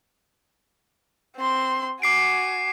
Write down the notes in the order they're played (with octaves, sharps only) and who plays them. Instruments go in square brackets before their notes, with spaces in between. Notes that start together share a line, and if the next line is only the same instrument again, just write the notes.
[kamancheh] C4 C6
[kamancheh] F#4 G#5 [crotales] D6 C7 D7